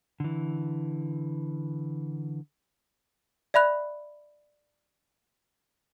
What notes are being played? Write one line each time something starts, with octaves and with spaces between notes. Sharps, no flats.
D3 E3
D5 E5 B5 F#6